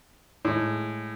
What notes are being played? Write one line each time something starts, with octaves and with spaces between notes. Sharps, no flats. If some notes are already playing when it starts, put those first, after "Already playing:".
A2 G#3